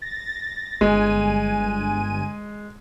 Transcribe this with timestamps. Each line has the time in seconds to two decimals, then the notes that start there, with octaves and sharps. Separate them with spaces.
0.02 A6 A#6
0.81 G1 G#3 G#5 D#7